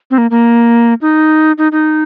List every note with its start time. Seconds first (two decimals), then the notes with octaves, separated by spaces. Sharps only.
0.11 C4
0.18 A#3
0.31 A#3
1.02 D#4
1.58 D#4
1.72 D#4